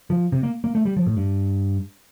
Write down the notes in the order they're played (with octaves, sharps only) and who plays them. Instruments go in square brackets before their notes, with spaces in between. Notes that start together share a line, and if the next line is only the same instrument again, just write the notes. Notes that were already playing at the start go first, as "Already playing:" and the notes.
[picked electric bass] F3
C3
A#3
A#3
A3
G3
F3
A2
G2